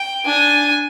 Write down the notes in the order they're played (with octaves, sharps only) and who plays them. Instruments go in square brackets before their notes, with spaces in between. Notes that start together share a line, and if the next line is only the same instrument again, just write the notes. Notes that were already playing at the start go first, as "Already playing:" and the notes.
Already playing: [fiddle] G5
[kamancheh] D4 [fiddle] G#5